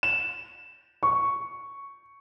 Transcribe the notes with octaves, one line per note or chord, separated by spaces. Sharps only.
E7
C#6